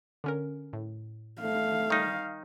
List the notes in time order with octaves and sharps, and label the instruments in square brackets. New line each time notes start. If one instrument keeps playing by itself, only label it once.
[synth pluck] D3 C#4 A#4
A2
[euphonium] A3 [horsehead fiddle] F5
[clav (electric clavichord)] D#3 D#4 [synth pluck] G3